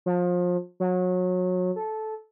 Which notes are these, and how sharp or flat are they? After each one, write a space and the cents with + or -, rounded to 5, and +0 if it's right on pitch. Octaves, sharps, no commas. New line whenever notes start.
F3 +30
F#3 -25
A4 -15